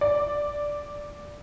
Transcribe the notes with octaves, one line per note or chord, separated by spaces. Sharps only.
D5